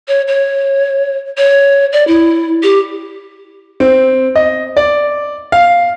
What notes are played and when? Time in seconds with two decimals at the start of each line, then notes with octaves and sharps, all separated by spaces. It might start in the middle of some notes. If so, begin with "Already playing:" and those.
0.08 C#5
0.27 C#5
1.37 C#5
1.92 D5
2.07 E4
2.63 G4
3.80 C4
4.36 D#5
4.77 D5
5.52 F5